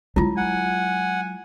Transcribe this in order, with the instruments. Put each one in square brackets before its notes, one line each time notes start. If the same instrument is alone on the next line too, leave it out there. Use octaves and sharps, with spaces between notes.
[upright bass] F#3 G#3 [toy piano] E4 F4
[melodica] F#5 [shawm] G#5